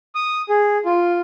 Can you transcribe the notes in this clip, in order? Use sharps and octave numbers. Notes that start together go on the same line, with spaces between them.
D#6
G#4
F4